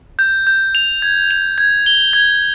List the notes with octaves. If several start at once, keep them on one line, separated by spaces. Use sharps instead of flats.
G6
G6
F7
G#6
F7
G#6
G7
G#6